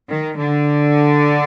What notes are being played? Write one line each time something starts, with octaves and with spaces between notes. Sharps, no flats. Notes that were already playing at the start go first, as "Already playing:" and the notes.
D#3
D3